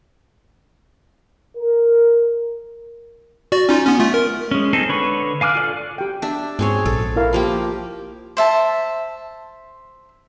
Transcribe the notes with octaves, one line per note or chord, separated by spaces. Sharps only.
A#4
F#4 D5
C#4 D#4 F4
B3 C#4
A3 F4
A#4
G#3 C#4
C4 D#4 G#4 A4
D3 B4 C#5 B5 C#6
F5 G#5 D6 F6 F#6
F4 A4 D5
G4 G5
D4 E5
G#2 C4 G#4 C#5
A#1 A4
E4 A#4 F5
F3 A#3 G4
C5 E5 A5